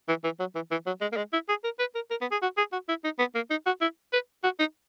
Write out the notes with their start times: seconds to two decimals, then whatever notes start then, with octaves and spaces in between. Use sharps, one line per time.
0.08 E3
0.24 E3
0.40 F#3
0.55 E3
0.71 E3
0.87 F#3
1.01 G#3
1.12 A#3
1.17 G#3
1.33 E4
1.49 G#4
1.64 A#4
1.79 B4
1.95 A#4
2.10 A#4
2.21 B3
2.32 G#4
2.42 F#4
2.57 G#4
2.72 F#4
2.89 E4
3.04 D#4
3.19 B3
3.35 A#3
3.50 D#4
3.66 F#4
3.81 E4
4.13 B4
4.44 F#4
4.59 D#4